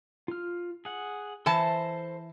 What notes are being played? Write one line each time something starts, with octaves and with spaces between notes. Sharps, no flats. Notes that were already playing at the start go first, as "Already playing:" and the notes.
F4 F6
G#4 F#5
E3 A4 C5 A5